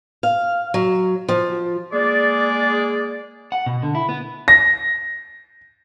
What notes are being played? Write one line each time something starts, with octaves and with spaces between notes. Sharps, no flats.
F5
F#3
F3
G#3 A#3 G#4 D5
F#5
B2
D3
E4
B3
A#6